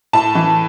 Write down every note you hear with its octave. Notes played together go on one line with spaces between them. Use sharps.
A2 A5
E3